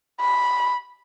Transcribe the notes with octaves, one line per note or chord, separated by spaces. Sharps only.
B5